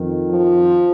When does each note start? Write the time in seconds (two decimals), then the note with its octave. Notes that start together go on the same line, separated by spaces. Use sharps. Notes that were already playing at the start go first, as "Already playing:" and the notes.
Already playing: F2 D#3
0.28 F3